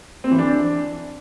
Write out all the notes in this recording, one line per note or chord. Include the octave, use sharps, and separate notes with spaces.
C4
E3
D4